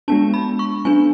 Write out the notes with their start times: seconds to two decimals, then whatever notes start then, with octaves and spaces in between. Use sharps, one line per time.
0.08 G#3 B3 D4 A5
0.34 B5
0.59 C#6
0.85 F#3 B3 D4 G#5